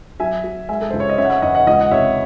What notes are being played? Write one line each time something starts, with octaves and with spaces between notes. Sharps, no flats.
F#3 E5 G#5
F#3
G#3 E5 G#5
A4
C#2 C5
C#5
D#5
C#3 C#5 E5
F#5
C#5 E5
E2 D#5 F#5
D#5 F#5
C#2 D#5 F#5
F#5
C3 C#5 E5